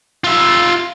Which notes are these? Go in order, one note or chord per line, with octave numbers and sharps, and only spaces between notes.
F4 E5